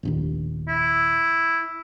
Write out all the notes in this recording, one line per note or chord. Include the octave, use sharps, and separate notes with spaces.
F1 A#1 D#2
E4